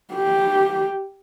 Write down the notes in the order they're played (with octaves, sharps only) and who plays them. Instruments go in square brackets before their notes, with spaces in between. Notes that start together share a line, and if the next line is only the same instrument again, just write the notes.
[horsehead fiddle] G4